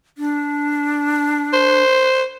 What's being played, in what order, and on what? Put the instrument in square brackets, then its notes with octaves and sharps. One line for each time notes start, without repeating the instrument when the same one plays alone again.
[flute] D4
[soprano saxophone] C5